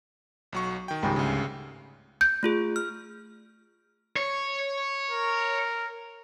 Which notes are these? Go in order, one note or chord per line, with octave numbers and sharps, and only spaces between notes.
B1 F#3 C#6
D#3 G5
C#2 G#2 G3
D2 C#3
G6
A3 F4 G#4
F6
C#5
A#4